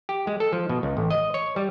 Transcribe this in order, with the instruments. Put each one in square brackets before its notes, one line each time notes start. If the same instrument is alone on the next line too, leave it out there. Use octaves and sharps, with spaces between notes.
[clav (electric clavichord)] G4
G#3
A4
F3
B2
C#2
A1
D#5
C#5
G3